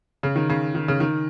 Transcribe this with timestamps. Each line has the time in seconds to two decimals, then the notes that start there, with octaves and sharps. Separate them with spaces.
0.23 C#3
0.36 D#3
0.49 C#3
0.75 D#3
0.88 C#3
1.00 D#3